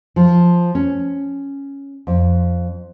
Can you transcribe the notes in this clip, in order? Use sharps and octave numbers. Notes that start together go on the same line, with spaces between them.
F3
C#4
F2